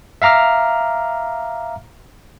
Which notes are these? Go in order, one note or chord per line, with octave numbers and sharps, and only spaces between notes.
E5 F5 A#5 D6 F6